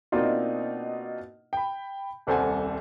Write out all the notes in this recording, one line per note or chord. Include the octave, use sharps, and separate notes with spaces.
B2 A#3 C4 D4 D#4 F4
G5 B5
D#1 C2 A4 C5 F#5 G#5